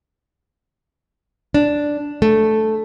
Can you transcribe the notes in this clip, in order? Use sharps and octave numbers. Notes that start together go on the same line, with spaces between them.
D4
A3